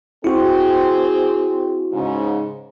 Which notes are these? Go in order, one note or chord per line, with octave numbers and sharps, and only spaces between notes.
C4 E4 F#4 G#4
G#2 C#3